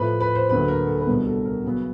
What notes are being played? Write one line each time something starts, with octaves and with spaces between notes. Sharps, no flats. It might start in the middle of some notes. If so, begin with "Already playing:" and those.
Already playing: A2 F3 A3 B4
B4
C5
D2 D3 F#3 A#3 B4
A#4
A4
B4
C2 B2 G3 B3 D4 A#4
A4
A#4
C#3 F#3 B3